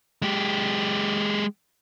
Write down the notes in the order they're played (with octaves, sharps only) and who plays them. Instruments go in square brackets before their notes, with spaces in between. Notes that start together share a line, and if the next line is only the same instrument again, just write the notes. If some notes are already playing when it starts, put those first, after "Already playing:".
[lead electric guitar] G#3 G4